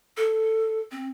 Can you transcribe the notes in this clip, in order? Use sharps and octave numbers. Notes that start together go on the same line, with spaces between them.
A4
C4